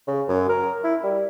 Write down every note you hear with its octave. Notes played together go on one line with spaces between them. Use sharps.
C#3
F#2
A#4
E4
G3